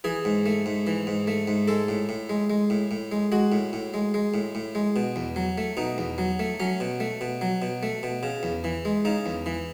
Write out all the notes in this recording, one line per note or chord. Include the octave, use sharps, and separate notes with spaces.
E3 G#4
G#2
A3
G#2
E3
G#2
A3
G#2
G#3 A4
A2
A2
G#3
G#3
A2
A2
G#3
G#3 F#4
A2
A2
G#3
G#3
A2
A2
G#3
B2
E2
F#3
A3
B2 D#4
E2
F#3
A3
F#3 C#4
B2
A3
B2
F#3
B2
A3
B2
C#3
E2
E3
G#3
C#3 D#4
E2
E3